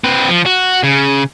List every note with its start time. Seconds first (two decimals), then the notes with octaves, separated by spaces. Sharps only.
0.04 C4 B4
0.29 F3
0.46 F#4
0.83 C#3